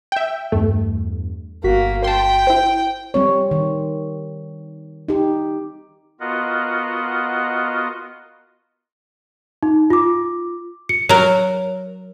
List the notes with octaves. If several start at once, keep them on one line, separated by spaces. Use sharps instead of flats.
E5 G5
E2 G2 A3
G1 A#3 F#4 B6
G5 A5 C6
E4 C5
G3 C4 C#5
D#3
D#4 G4
B3 F4 F#4 A#4 D#5 F#5
D#4
F4 D6
C#7
F#3 A#4 C#5